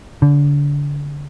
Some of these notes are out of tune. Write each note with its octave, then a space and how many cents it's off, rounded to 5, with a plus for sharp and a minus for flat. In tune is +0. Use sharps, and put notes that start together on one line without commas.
D3 -30